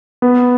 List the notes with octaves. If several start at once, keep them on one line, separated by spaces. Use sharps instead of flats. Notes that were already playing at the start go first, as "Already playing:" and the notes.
B3